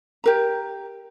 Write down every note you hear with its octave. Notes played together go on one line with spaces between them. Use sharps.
G4 A#4 A#5